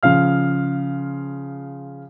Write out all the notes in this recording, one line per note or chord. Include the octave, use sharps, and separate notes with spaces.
C#3 F3 F5 F6